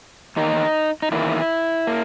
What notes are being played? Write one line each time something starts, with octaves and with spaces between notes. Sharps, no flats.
E2 D#3 A#3 D#4
D#4
E2 D#3 A#3 E4
A#3